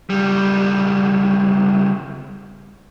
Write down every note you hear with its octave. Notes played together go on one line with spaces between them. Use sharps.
C#2 G3